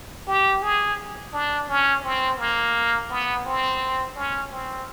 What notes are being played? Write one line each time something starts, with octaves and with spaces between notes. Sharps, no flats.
G4
G#4
D4
C#4
C4
A#3
B3
C4
C#4
C4